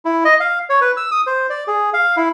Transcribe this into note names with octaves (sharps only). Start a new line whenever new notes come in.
E4
D#5
F5
C#5
B4
E6
D#6
C5
D5
G#4
F5
E4